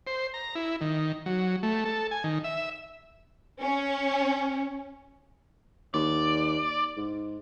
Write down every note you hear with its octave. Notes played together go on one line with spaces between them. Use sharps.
C5
A#5
E4
D#3
F#3
A3
A4
G#5
D#3
E5
C#4
D#2 D5
G#2